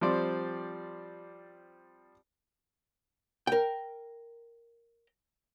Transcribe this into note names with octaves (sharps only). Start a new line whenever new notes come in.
F3 G3 C4 C5 D5
A#4 G5